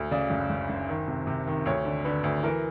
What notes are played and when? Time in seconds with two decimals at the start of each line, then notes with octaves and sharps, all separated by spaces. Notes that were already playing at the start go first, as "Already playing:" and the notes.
Already playing: D2
0.11 C#3 D5
0.30 F#1
0.50 F#1
0.69 F#1
0.89 D#3
1.08 C3
1.27 C3
1.47 D#3
1.66 D2 C#5
1.85 D3
2.05 D3 B4
2.24 D2
2.43 E3 A#4